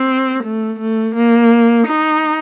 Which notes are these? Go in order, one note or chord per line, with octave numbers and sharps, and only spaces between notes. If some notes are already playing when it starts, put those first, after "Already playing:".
Already playing: C4
A3
A3
A#3
D#4